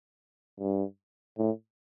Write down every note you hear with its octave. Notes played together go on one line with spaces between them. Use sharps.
G2
A2